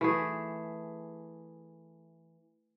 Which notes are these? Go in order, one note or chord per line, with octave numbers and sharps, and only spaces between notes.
E3 A3 G#4